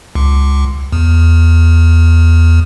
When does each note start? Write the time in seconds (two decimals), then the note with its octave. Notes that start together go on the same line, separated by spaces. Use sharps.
0.15 C#2
0.92 E2